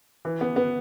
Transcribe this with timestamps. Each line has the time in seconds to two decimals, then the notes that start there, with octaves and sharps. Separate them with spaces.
0.25 E3
0.41 B3
0.56 B3